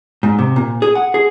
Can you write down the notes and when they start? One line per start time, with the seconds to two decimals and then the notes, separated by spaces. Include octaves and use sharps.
0.23 G#2
0.39 C3
0.56 A#2
0.82 G#4
0.95 F#5
1.14 G#4